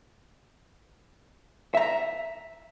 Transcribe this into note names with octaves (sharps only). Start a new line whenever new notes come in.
E5 A#5